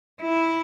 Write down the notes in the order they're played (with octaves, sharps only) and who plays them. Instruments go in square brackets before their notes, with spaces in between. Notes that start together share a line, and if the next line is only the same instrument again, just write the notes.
[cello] E4